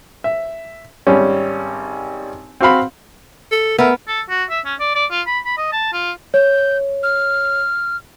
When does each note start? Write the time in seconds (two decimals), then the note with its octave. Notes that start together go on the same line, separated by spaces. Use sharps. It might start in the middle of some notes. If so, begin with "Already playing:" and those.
0.24 E5
1.07 G#1 G3 C#4
2.61 C4 F#4 F5 B5
3.52 A4
3.78 A3 B3 A#4
4.07 A4
4.30 F#4
4.50 E5
4.65 C#4
4.80 D5
4.95 D5
5.11 F4
5.27 B5
5.45 B5
5.58 D#5
5.72 A5
5.93 F4
6.34 C#5 G6
7.03 F6